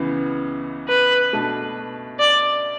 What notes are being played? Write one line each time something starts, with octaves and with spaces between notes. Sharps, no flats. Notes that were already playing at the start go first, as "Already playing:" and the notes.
Already playing: C#2 C#3 E3 B3
B4
B2 A3 D4
D5